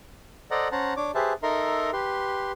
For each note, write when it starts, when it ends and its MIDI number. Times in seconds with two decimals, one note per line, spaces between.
0.51 0.68 69
0.51 0.68 72
0.51 0.68 74
0.51 0.68 75
0.51 0.68 78
0.51 0.68 82
0.72 0.94 61
0.72 0.94 72
0.72 0.94 78
0.72 0.94 81
0.72 0.94 82
0.97 1.11 62
0.97 1.11 73
0.97 1.11 86
1.15 1.33 67
1.15 1.33 68
1.15 1.33 71
1.15 1.33 72
1.15 1.33 76
1.15 1.33 81
1.43 1.91 63
1.43 1.91 69
1.43 1.91 70
1.43 1.91 76
1.43 1.91 82
1.43 1.91 84
1.93 2.52 67
1.93 2.52 71
1.93 2.52 84